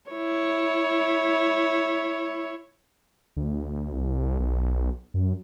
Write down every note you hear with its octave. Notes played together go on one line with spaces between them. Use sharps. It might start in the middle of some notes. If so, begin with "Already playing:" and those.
E4 C#5
D2
C2
B1
F#2